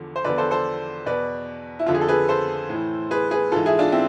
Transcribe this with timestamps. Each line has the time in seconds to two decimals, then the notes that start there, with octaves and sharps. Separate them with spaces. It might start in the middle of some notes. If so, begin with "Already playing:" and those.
Already playing: E2 D3 F3
0.16 C5
0.24 E2 D3 F3 B4 D5
0.38 A4 C5
0.51 A4 C5
1.06 E2 B2 B4 D5
1.79 E4
1.86 F2 D3 F3 F4
1.94 G#4
2.01 A4
2.08 G#4 B4
2.29 A4 C5
2.69 A2 E3
3.11 G#4 B4
3.31 G#4 B4
3.52 G#2 E3 F4 A4
3.66 E4 G#4
3.79 D4 F4
3.92 C4 E4